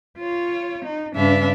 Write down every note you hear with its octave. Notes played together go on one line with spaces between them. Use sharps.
F4 C#5
D#4
G2 C#3 D4 B4 E5 F5